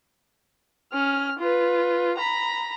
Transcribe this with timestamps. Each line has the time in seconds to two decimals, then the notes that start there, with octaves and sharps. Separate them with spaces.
0.92 C#4 F6
1.39 F4 B4
2.17 A#5 B5